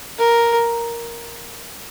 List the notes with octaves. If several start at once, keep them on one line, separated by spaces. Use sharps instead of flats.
A#4